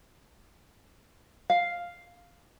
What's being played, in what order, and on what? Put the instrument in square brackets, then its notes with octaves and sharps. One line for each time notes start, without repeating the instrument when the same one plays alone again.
[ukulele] F5